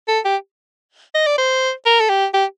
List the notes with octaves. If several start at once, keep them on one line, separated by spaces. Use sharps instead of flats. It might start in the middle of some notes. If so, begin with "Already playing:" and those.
A4
G4
D#5
D5
C5
A#4
A4
G4
G4